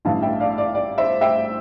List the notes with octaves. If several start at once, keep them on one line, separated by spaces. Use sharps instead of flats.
A1 G2 E3 F5 A5
E5 G5
D5 F5
D5
D5
C5 E5
E5 G5